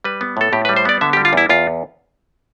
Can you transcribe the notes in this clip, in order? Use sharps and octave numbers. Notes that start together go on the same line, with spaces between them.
G3 B4
B3
A2 A4
A2 G4
B4
G3
C5
B3 D5
D3 E5
G4
G3
F4
E2 E4
E2 F4